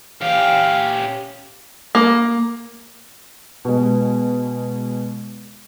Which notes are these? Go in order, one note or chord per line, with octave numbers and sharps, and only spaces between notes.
C#4 G4 F5
A#3
B2 G#3